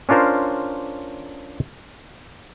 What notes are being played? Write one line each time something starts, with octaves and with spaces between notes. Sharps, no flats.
C#4 D4 F4 A#4 C5